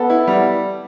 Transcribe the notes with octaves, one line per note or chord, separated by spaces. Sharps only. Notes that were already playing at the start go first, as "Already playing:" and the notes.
Already playing: B3 A4
E4
G3